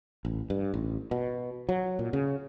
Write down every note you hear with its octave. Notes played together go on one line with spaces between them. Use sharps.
A1
G2
A1
B2
F#3
A#2
C#3